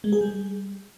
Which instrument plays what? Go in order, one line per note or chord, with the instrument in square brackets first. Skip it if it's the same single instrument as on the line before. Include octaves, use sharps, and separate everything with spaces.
[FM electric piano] G#3
G#4
G3